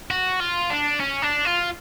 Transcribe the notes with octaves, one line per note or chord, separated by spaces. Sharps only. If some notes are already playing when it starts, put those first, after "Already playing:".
F#4
F4
D4
C#4
D4
F4